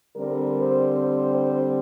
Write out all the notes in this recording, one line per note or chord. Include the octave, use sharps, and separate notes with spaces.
D3 G3 C4 A#4
C5
C5
C5